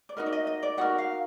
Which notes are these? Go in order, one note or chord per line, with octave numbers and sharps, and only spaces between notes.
D5
D#4 F#4 A#4 D#5
D5
D#5
D#5
D5
D#4 F#4 A#4 F#5
F5